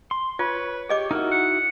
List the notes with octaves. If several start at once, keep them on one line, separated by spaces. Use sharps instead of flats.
C6
F4 B4 C#5
G4 G#4 D#5 D6
A#3 D#4 E4 F#4
F#5